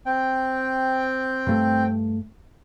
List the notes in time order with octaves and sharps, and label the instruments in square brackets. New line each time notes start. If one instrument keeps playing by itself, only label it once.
[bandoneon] C4 G5
[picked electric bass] G2 A3